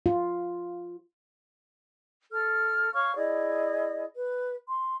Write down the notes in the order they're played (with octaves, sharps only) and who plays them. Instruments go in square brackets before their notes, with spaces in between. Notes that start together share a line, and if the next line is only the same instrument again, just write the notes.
[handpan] F4
[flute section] A4 F6
C#5 F5 C#6 F6
E4 G#4 D5 D#5
B4
C6